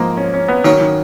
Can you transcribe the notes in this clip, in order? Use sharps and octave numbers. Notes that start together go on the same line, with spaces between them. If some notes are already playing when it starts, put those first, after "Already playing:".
Already playing: G#2 F3 G#3 A#3 D#4
C#4
C#4
B3
D#3 F#3 A#3 C#4 F#4
D#3